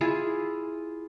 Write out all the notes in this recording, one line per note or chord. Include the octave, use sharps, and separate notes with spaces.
E4 F4 G#4